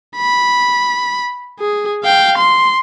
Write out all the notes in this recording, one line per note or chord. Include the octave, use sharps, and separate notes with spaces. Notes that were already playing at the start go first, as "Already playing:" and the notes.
B5
G#4
F5 G5
C6